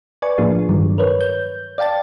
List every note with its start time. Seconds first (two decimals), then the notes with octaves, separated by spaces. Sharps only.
0.22 B4 D5 G#5 C#6
0.38 A2 F3 A#3 D4 F4 G#4
0.69 G2 D#3 F#3 G3
0.98 A#4 B4 C#5
1.21 G6
1.78 D5 F5 G5 A5 A6